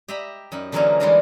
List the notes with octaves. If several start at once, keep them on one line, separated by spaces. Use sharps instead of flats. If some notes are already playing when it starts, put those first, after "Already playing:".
G4 D#5 E5 A#5 B5
F#2 D#4 B5
D3 E3 F#3 A#3 C#4 D#4
E3 G3 G#3 D4 D#4 A#4